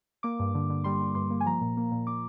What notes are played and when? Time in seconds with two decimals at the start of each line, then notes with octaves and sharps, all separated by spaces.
0.23 A#3 D6
0.39 G2
0.55 D3
0.70 D3
0.84 G3 C6
1.00 G3
1.15 G2 C6
1.30 A#3
1.41 G#5
1.45 F3 A#5
1.61 A#2
1.77 A#3
1.91 A#2
2.07 A#2 D6